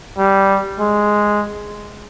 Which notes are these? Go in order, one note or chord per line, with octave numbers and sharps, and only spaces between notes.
G3
G#3